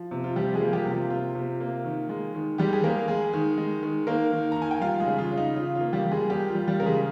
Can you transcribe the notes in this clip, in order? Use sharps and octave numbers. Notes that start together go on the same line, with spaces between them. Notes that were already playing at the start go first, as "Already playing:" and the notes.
Already playing: F3
C3
F4
F3 G3 G4
G#3 G#4
A#3
G3 G4
C3
F4
C3 F4
C3
A#3
D#3
G#3
D#3
G3 G#3 G4
G#4
G#3 A#3 A#4
G#3 G#4
D#3
G#3
D#3
D#3 A#3 A#4
D#3
D#3 A#5
G#5
G5
G3 F4 F5
G#3 G#4
C#3
F4
C#3
D#4
C#3 F4
F4
A#3
G3 G4
G3
G#3 G#4
G3 A#3 G4
F4
G3
G3 G4
C#3 A#4
G#3 G#4